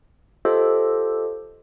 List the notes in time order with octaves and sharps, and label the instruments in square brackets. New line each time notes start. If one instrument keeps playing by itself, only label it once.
[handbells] F4 G4 A4 C5 D#5